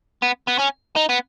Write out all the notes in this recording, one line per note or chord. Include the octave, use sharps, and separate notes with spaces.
B3
B3
C#4
D#4
B3